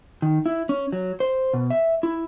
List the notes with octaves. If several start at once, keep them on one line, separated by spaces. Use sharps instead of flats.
D#3
E4
C#4
F#3
C5
B2
E5
E4